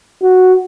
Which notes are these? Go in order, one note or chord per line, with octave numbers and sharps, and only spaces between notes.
F#4